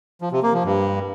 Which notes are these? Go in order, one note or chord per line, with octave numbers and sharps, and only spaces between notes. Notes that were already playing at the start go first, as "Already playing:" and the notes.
F3
C3
A#3
F3
G2